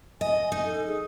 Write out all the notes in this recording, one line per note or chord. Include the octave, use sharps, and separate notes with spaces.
D#5 G#5
D#4
A4
G#4